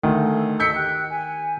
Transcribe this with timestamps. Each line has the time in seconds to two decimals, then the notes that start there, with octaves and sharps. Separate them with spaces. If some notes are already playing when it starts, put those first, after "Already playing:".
0.03 D2 D#3 A4
0.60 A4 D#5 E6 G6 B6 C#7
0.76 G4 G5 F#6
1.09 G#5